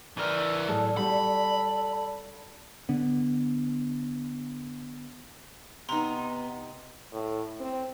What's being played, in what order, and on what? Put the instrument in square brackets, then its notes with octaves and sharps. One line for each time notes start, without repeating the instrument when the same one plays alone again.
[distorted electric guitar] E3 A#4 [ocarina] D5
[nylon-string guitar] A2 F#3 G#4 [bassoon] A4
[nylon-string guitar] G3 F#4 [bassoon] A4 [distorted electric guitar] B5
[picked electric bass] D3 B3
[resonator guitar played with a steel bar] C3 D#4 [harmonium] B3 [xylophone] A#5 C6
[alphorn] A2
C4